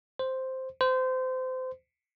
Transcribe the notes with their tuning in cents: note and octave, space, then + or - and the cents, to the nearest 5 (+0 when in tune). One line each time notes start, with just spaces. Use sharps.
C5 +0
C5 -25